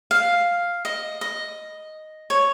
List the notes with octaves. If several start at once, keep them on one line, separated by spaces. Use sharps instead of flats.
F5
D#5
D#5
C#5